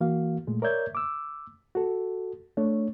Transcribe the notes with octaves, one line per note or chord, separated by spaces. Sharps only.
E3 A#3 F#4 F5
A#2 G#3 A3
A#4 C#5 D5 E5 G6 G#6
D6 E6
F#4 A4
A3 D4 C#5